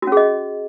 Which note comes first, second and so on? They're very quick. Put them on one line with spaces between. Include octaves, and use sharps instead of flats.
F#4 C#4 G#4 D#5